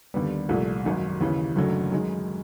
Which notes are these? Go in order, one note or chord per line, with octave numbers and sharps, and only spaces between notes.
D#2 D3 G3 B3
C2 A#2 F3 A3
G#1 F#2 D#3
D#2 C#3 E3
F#1 F#2 D3 F#3 A3
F#2 D#3 G#3